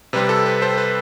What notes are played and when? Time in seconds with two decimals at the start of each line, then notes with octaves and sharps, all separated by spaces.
0.13 C3 G3 C4 B4
0.29 A4
0.46 B4
0.62 A4 C5
0.78 B4